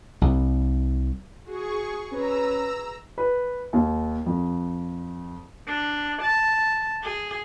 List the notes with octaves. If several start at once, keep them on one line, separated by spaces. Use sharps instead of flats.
C2
F#4 G#4 C#6
C#4 B4 A#5 E6
B4
D#2
F2
D4
A5
G#4